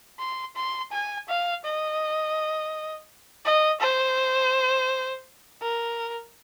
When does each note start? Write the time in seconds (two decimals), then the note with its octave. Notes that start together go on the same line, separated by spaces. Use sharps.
0.19 C6
0.56 C6
0.92 G#5
1.28 F5
1.64 D#5
3.45 D#5
3.81 C5
5.61 A#4